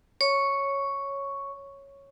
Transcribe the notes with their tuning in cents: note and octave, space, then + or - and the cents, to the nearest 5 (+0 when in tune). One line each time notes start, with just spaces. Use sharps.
C#5 -5 C#6 +0